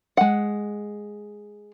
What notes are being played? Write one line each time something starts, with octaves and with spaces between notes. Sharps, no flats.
G#3 F#5